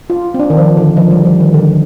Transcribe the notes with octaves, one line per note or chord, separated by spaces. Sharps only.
F4
C4
D4
D#3
F3
D3
F3
G3
F3
D#3
D3